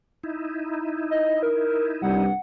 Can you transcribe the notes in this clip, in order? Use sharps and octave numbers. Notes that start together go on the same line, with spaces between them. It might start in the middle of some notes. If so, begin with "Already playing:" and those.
D#4 E4
D#5
A#4
C2 G2 F#5